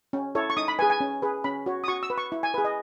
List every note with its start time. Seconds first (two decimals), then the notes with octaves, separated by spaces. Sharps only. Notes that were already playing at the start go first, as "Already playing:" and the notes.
0.13 C#4
0.35 E4 A4 C#5
0.50 C#6
0.57 D#4 D#6
0.68 B5
0.79 G#4 B4 G#5
0.90 G#5
1.00 C#4
1.22 G#4 B4
1.44 C#4 B5
1.66 F#4 C#5
1.84 D#6
1.88 F#4 C#6
2.03 E6
2.10 B4
2.18 C#6
2.32 E4
2.43 G#5
2.54 G#4 B4
2.65 D#5